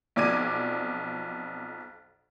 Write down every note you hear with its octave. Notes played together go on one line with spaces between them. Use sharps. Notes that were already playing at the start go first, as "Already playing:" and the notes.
B1 F2 D5 D6 G#6 D#7